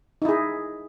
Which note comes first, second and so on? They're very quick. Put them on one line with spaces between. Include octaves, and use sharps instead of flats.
D#4 E4 G#4